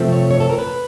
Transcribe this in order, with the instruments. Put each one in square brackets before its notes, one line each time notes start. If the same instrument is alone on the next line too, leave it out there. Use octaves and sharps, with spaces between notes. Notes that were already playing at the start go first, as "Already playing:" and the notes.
Already playing: [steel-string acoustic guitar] C3 F3 A3 C4
C#5
C#5
A4
A#4
B4